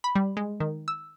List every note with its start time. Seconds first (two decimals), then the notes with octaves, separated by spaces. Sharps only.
0.04 B5
0.15 G3
0.37 G#3
0.60 D#3
0.88 E6